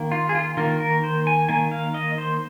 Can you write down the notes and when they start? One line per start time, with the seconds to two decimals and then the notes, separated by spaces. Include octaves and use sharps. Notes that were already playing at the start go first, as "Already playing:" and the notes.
Already playing: D#3 A#3
0.12 F4
0.29 G#4
0.35 F4
0.57 D#3 A#3 F4
0.80 A#4
1.03 C5
1.27 G#5
1.49 D#3 A#3 G#5
1.72 F5
1.94 D#5
2.18 C5